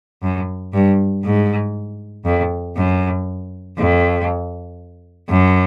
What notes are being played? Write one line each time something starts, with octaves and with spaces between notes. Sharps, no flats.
F#2
G2
G#2
F2
F#2
F2
F#2